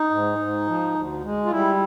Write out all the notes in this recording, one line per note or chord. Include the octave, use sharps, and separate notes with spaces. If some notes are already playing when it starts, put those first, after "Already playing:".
Already playing: D#4
G#2
G#2
F3
D2
G#3
F4
G3 E4